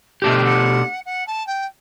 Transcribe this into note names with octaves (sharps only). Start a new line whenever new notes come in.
B2 A3 D4 G4 E5
G5
F#5
F#5
A5
G5